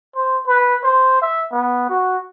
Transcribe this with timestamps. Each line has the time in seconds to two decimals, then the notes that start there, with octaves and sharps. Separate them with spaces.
0.15 C5
0.48 B4
0.84 C5
1.22 E5
1.52 B3
1.89 F#4